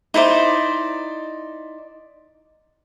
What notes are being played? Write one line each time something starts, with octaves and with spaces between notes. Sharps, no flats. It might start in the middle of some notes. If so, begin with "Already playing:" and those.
D#4 E4 C5 D5